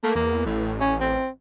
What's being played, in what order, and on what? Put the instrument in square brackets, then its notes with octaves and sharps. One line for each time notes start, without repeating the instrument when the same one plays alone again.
[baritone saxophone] A3 [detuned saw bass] A#3
[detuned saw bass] E2 [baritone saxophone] A#3
[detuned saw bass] A1 [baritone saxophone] A2
[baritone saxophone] C#4
C4